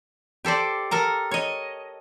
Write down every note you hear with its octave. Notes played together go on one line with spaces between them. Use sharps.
G4 A4 C5 D5
A4 A#4 A#5
C#5 D#5